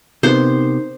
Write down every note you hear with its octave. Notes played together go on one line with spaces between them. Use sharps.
C3 B3 D#4 A#4 C5